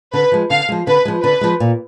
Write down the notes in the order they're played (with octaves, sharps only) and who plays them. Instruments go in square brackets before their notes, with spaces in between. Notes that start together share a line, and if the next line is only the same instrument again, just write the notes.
[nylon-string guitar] D3 [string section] B4
[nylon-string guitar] F3 G#3
[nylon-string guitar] D3 [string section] F5
[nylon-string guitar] F3 G#3
[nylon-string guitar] D3 [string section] B4
[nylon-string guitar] F3 G#3
[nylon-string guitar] D3 [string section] B4
[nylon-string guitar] F3 G#3
A#2